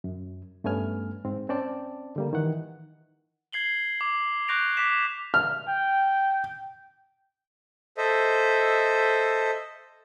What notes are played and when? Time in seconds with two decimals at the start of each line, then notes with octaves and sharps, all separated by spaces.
0.04 F#2
0.64 G2 A3 B3 C#4 G#5 F6
1.25 G#2 C4
1.49 C4 C#4 D5 G5 A5
2.16 D3 G3 A#3
2.33 D#3 E3 F#5
3.53 G#6 C7 F#7 G7
4.01 D6
4.48 C#6 F#6 G6 A#6 D7 F7
4.77 D6 G#6 A#6 B6 E7
5.34 F6
5.69 G5
7.97 A4 C5 D#5 E5